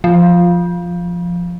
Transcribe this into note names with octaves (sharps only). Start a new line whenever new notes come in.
F3